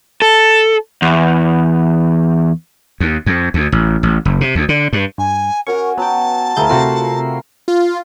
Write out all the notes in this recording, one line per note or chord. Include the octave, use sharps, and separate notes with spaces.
A4
E2
D#2
F2
D2
A1
A1
F#1
C3
D2
D3
G2
G2 G#5
C#4 F#4 A#4 G#5 C#6
F#3 B3 G5 A5
D2 E4 G#4 A#4 F5 G6
C3 A3 C4 F4 F#4 C7
F4